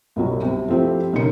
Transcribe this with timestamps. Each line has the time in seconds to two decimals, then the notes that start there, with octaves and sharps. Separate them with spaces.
0.16 C2 B2 F#3 G3
0.43 C3
0.68 F3 A3 C4 E4 G4
1.13 B1 C#3 A#4 C#7